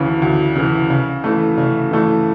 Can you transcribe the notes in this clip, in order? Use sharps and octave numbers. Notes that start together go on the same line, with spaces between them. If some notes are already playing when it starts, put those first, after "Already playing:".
Already playing: D2 C#3 E3
D2
C#3 E3
C#3
E3 A3
C#3
E3 A3